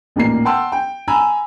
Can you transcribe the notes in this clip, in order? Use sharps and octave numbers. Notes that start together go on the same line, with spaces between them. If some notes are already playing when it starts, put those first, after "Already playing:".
A1 D#2 A#2 A#4 C7
F#5 G5 A5 C6 E6
G5
G#5 A#5 B5 E6